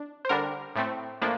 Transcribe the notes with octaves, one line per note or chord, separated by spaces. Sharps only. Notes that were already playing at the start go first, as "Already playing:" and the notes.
Already playing: D4
C5
D3 G3 D4 A#4
A2 A3 C4
A2 F3 A#3 D4